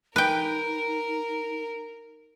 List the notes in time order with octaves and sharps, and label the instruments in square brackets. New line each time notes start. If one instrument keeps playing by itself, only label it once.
[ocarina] D#4 [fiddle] A#4 [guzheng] B4 G5